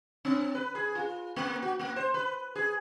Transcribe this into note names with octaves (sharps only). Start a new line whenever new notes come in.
C4
B4
G#4
F4
A#3
F#4
A#3
C5
B4
G#4